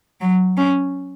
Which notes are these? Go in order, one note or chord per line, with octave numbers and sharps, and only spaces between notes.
F#3
C#4